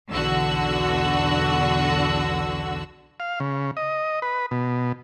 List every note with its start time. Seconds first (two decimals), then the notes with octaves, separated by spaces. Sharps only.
0.11 B1 E2 D3 F#4 E6
3.20 F5
3.40 C#3
3.77 D#5
4.22 B4
4.51 B2